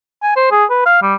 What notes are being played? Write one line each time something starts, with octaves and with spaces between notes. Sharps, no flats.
G#5
C5
G#4
B4
F5
G3